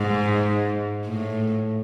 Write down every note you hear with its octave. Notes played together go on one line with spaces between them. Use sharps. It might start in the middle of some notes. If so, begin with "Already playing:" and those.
Already playing: G#2
A2